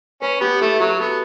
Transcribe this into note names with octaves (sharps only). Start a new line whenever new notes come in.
C#4 B4
B3 G4
A3 E4
F#3 F#4
B3 A4